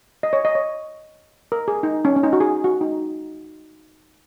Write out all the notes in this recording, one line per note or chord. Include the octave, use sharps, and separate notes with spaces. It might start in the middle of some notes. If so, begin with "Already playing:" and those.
D#5
C#5
D#5
C#5
A#4
G#4
D#4
C#4
C#4
D#4
F#4
G#4
F#4
D#4